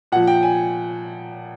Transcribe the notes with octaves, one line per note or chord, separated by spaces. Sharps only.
A#2 F3 F#5
G5
G#5